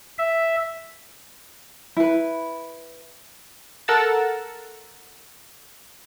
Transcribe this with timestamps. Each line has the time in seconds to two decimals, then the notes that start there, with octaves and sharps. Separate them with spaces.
0.18 E5
1.97 E4 B4
3.88 A4 A#4 F#5 E6 A6